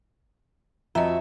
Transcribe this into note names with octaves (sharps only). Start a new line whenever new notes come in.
F2 F#4 D#5 E5 A#5